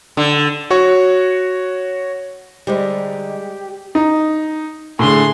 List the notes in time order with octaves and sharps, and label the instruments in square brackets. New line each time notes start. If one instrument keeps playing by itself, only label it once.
[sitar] D3
[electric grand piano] F#4 C#5 C#6
[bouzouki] D3 D#4 [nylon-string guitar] G3 G#3 C5 [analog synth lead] G4
[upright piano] D#4
[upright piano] A2 D3 [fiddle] G#4 C6